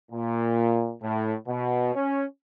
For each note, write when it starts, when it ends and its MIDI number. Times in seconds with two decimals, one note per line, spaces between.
0.12 0.93 46
1.02 1.34 45
1.47 1.94 47
1.95 2.24 61